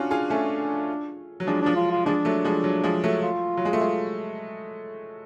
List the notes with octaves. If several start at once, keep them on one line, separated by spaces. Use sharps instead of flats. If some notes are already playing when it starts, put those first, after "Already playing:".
Already playing: C#4 D4 F4 F#4
F4 G#4
A3 C#4
F#3
F3 G#3 D4
F3 D4
F4
F4
F3 G#3 D4
F#3 A3
F3 G#3
F#3
F3 G#3
F#3 A3
F4
F#3
G#3
A3
G#3